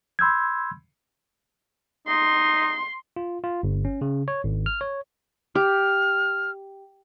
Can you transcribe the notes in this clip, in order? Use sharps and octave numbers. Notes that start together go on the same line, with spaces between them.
B5 C6 E6 G6 G#6
D#4 C6
F4
F4
G1
C#4
C#3
C#5
G#1
F6
C#5
G4 F6